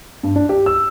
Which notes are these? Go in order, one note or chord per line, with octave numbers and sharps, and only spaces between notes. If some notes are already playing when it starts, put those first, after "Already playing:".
G2
D4
G4
E6